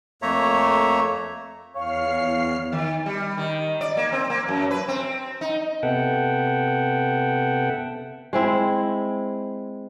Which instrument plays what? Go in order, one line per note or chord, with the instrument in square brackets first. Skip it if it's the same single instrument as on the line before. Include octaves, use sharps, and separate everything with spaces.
[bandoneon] F2 A3 A#3 C#5 E5 A#5
[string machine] E2 F6 C7 [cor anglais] C#5 [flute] F5
[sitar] D#3
G3
D#3
D5
A#3
C4
A#3
F#2
B4
C4
D#4
[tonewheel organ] C3 B3 A4 E5 F#5 G5
[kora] G#3 C4 E4